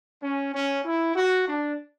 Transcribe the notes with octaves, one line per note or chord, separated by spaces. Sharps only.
C#4
C#4
E4
F#4
D4